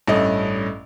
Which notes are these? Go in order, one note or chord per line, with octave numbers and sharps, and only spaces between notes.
A1 G2 A3 C#4 D#5